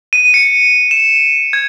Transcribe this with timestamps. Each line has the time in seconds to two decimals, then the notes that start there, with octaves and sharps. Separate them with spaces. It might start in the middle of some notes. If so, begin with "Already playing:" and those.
0.13 D#7
0.34 C#7
0.91 E7
1.53 G#6